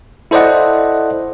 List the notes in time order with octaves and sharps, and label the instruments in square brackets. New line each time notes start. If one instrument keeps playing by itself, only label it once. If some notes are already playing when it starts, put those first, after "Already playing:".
[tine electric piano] E4 A4 C5 D5 D#5 F#5